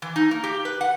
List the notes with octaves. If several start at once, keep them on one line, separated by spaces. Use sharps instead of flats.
E3
D#4
A#3
G4
B4
F#5